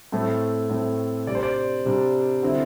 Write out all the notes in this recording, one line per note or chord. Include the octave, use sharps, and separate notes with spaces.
A2 A3 C4
A2 A3 C4
C3 G3 D4 D5
C5
D5
C3 G3 D4
D3 C4 E4